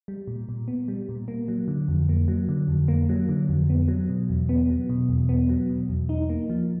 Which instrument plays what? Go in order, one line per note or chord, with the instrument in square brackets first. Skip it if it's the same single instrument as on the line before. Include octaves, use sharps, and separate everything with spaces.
[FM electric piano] G3
A#2
A#2
B3
G3
A#2
A#3
F#3
D3
F2
A#3
F#3
D3
F2
A#3
F#3
D3
F2
B3
F#3
B2
E2
B3
F#3
B2
E2
B3
F#3
B2
E2
D#4
A#3
F3